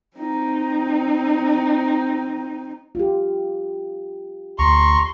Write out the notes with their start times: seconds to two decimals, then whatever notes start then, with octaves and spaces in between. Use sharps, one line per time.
0.17 C4 D#4
2.95 F4 G4
4.59 D2 A#5 C6 C#6